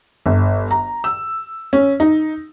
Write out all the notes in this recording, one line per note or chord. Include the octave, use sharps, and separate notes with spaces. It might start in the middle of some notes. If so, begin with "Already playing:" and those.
G1
A#5
E6
C#4
D#4